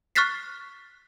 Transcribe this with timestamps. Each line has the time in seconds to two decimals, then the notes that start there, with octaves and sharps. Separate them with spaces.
0.15 C#6 F6 F#6 A6 B6 C7